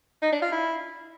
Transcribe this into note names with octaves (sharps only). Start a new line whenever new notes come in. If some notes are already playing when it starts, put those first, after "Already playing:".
D#4
D4
F4
E4